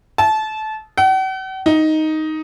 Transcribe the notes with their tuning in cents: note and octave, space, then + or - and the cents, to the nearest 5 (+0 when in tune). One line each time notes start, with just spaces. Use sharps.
A5 -25
F#5 +45
D#4 +5